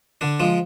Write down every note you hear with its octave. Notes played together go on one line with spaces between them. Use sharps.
D3 D4
F3 G#3